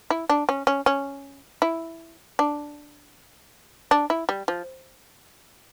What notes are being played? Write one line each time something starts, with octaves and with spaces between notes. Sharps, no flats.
E4
D4
C#4
C#4
C#4
E4
D4
D4
E4
G3
F3